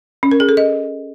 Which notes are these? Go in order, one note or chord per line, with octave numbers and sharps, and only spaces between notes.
C#4
A#4
G#4
A4
D#5